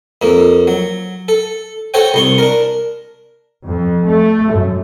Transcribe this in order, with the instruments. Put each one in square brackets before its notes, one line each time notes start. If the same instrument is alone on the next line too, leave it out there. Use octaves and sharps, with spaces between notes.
[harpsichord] F2 A#3
F#3
A4
F#4 A4 C5 C#5 G5
C2 C6 C#6
D4 A#4
[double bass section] F2
A3
F#2